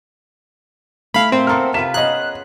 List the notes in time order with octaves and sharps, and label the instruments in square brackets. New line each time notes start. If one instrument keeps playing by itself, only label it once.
[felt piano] A3 [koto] E4 [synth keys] F5 B5
[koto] A#2 [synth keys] C4
[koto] B3 A4 A#4 [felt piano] C6 F6
[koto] C3 F4 B4 [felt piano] B6 E7
[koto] B3 C#4 G#4 [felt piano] D#5 A#5 [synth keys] F#6